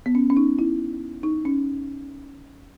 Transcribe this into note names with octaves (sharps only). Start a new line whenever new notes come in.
B3
C#4
C#4
D#4
E4
D#4
C#4